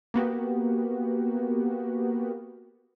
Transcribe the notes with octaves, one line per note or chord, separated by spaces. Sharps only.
A#3 B3 F#4 G4